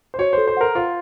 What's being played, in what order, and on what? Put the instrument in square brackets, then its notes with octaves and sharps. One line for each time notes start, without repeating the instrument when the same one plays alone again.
[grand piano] C5
[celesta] F#4 [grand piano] C#5
[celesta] A4 [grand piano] C5
[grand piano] C5
[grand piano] A#4 [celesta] F#5
[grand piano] F4 [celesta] C5